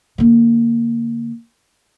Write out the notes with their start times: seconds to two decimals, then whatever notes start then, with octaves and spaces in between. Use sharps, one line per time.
0.18 D3 A#3